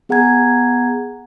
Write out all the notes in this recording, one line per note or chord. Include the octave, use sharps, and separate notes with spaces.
B3 G#4 F#5 G#5 A#5 G#6